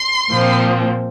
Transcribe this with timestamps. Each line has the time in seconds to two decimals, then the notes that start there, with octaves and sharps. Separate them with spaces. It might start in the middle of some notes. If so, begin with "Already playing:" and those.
Already playing: C6
0.30 A#2 F3 C4